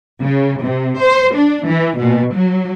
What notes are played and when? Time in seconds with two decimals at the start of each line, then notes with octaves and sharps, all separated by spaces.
0.21 C#3
0.62 C3
1.00 C5
1.33 D4
1.67 E3
1.97 B2
2.34 F#3